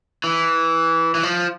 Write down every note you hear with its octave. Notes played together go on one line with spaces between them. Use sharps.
E3
E3
F3